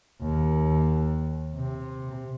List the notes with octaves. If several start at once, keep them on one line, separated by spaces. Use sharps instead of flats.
D#2
C3